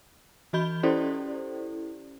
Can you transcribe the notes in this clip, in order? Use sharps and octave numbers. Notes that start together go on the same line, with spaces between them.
E3 F#4 D#5 B5 G6 G7
C#4 E4 G4 A4 C5 D5